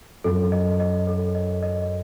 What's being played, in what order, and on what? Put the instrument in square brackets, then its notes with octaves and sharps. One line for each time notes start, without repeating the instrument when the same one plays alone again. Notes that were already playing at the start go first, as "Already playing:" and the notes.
[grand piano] F#2 [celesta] A4
[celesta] D#5
D#5
A4
D#5
D#5